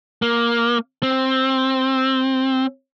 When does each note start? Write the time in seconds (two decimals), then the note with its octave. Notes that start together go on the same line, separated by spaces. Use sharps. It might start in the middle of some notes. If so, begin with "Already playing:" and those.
0.22 A#3
1.03 C4